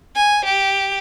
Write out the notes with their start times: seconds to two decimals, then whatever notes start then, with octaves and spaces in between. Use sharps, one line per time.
0.15 G#5
0.45 G4